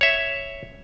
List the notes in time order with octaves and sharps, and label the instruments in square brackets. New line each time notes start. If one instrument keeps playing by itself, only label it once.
[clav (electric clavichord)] C#5 E5